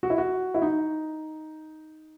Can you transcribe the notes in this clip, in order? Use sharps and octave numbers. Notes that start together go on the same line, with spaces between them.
F#4
E4
F#4
E4
D#4